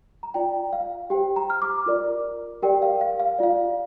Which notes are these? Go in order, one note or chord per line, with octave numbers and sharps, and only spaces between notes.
A#5
F4 D5 G5
F5
G4 C5 G5
A#5
F6
D6
F4 A#4 D5
G4 A#4 D5 G5
F5
F5
F5
F4 D5 F5